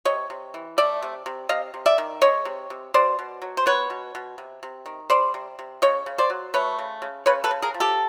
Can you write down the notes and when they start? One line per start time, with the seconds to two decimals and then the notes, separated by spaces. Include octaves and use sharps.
0.05 C3 C#5 D#5
0.30 C3
0.54 E3
0.78 A3 D5 E5
1.02 C3
1.26 C3
1.49 C3 D#5 F5
1.74 C3
1.86 D5 E5
1.98 D#3
2.21 G#3 C#5 D#5
2.45 C3
2.70 C3
2.94 B2 C5 D5
3.19 B2
3.42 F#3
3.57 C5
3.66 B3 B4 C#5
3.90 B2
4.15 B2
4.38 C3
4.63 C3
4.86 D#3
5.10 G3 C5 D5
5.34 C3
5.59 C3
5.82 C#3 C#5 D#5
6.06 C#3
6.18 C5 D5
6.30 F#3
6.54 A3 B4 C#5
6.79 C#3
7.02 C#3
7.26 C#3 B4 C#5
7.44 A4 B4
7.51 C#3
7.62 G#4 A#4
7.74 F3
7.80 G4 A4